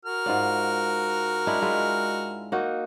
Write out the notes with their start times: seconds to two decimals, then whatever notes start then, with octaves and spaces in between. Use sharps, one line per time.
0.05 F#4 A#4 F6
0.26 G#2 F4 D5
1.47 G#3 D4 E4
1.61 G#3 E4 F4
2.52 A#3 D#4 F#4